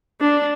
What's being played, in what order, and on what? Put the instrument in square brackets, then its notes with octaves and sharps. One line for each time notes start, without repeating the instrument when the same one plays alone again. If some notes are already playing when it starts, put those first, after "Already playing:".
[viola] D4